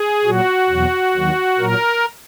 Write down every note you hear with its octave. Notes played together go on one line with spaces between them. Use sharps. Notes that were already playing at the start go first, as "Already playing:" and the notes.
Already playing: G#4
A#2 F#3 F#4
E2 B2 F#3
D#2 D#3 F#3
A#2 F#3 A#4